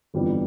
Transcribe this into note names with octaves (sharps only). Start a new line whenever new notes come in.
G1 F2 E3 G3 B3